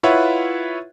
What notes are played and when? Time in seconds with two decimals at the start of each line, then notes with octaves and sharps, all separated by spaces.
0.03 E4 F4 B4 C#5 E5 F#5